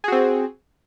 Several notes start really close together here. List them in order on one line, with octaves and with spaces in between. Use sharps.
G#4 F#4 C4